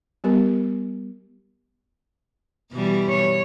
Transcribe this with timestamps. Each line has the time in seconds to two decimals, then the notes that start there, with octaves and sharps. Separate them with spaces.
0.24 G3 B3 G4 A#4
2.72 B2 E3 G3
3.09 C#5